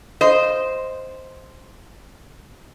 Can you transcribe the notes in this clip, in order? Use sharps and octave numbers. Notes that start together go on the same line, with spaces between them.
F4 C5 D#5